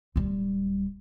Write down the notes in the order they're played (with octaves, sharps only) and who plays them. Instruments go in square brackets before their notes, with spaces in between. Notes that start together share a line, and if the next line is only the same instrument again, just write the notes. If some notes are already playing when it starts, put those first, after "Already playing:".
[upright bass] D1 G3